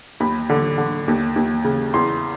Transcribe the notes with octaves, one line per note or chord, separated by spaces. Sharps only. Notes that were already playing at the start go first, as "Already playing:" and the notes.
D#2 B5
D3
D3
D#2
D#2
C#3
E2 C6